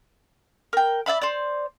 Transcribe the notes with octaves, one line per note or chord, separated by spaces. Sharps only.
A#4 G5
D5 E5 F5 B5
C5 D5